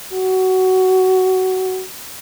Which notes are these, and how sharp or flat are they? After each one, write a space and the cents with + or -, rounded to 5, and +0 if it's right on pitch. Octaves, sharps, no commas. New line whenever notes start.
F#4 +15